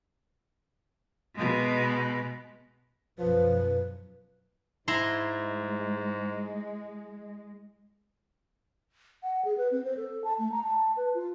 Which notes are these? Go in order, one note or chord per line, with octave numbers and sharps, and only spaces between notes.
B2 G#3
B1 F#2 F3 B4
G#2 G#3 E4 A#5 C6
F#5
G#4
B4
C4
C5
A4
A5
A3
A#5
A5
B4
F4